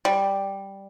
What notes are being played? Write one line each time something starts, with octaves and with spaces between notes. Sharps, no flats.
G3